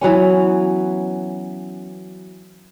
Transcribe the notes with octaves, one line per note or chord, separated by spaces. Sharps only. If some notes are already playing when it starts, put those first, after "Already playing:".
E3 F#3 B3 C#4